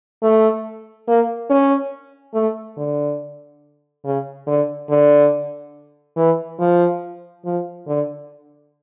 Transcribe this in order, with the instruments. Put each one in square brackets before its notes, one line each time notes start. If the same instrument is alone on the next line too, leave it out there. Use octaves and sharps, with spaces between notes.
[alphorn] A3
A#3
C#4
A3
D3
C#3
D3
D3
E3
F3
F3
D3